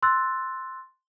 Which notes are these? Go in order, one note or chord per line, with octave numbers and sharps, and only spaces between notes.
C6 E6 F#6 A6